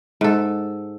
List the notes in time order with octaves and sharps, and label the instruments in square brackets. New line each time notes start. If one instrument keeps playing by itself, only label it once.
[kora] G#2 A4